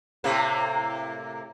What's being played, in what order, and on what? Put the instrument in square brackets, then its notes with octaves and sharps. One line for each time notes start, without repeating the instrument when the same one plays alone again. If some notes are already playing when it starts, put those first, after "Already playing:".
[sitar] A2 C3 A#3